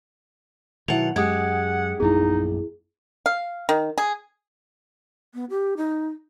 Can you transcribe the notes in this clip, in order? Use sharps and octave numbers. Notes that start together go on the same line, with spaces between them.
B2 D#3 F#3 E4 E5 F#5 F7
F#2 G#3 G4 F#5 D#6 G#6
A#1 F#2 B3 D#4 E4 G#4
F5
D#3
G#4
B3
G4
D#4